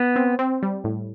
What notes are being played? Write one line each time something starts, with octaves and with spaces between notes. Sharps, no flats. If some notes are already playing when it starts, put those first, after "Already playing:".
Already playing: B3
C4
C4
G3
A2